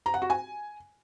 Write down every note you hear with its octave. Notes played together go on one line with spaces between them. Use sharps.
A#5
F#5
F#4
G#5